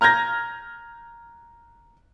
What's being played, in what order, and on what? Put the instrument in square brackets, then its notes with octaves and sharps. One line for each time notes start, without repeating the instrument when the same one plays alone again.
[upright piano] A#5 F6 G6 G#6 A#6